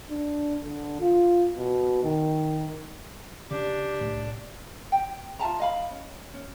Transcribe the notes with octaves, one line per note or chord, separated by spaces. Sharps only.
D4
D3
F4
B2
D#3
C#3 D4 G4
C2 A2
G5
F4 E5 A5 A#5
D#5 F5 B5
C#4
C#4